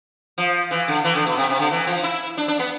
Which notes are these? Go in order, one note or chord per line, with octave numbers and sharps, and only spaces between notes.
F3
E3
D3
E3
D3
B2
C3
C3
D3
E3
F3
E4
D4
D4
B3